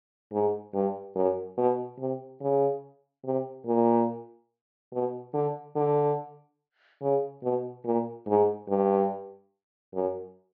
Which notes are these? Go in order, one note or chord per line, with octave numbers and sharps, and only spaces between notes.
G#2
G2
F#2
B2
C3
C#3
C3
A#2
B2
D3
D3
C#3
B2
A#2
G#2
G2
F#2